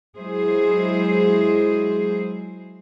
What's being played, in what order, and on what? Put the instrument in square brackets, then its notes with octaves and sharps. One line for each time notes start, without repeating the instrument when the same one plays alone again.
[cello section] F#3 G#3 E4 G#4 C5